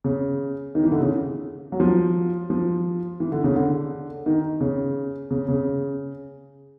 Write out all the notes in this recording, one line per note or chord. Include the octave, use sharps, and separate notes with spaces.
C#3
D#3
E3
D3
C#3
F#3
F3
F3
E3
D3
C#3
D3
D#3
C#3
C#3
C#3